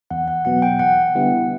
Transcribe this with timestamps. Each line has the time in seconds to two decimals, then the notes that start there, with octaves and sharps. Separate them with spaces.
0.10 E2 F#5
0.28 F#5
0.45 B2 F#3 B3 F#5
0.62 G5
0.79 E2 F#5
1.15 D3 G3 B3 E4